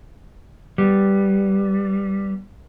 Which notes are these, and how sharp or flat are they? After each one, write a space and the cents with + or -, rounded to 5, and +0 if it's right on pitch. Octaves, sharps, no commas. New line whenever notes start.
G3 +0 B3 +0